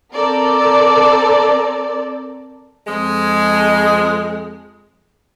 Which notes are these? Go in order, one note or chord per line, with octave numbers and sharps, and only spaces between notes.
C4 A4 A#4 D5
F2 G#3